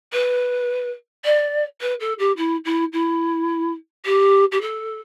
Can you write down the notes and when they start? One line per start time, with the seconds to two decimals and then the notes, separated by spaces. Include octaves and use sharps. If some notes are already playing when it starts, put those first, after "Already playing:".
0.12 B4
1.24 D5
1.81 B4
2.00 A4
2.19 G4
2.37 E4
2.65 E4
2.92 E4
4.05 G4
4.51 G4
4.61 A4